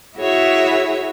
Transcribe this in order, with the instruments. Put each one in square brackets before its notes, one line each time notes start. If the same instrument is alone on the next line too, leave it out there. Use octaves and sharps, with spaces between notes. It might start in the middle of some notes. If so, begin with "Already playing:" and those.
[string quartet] E4 F#4 G#4 C#5 E5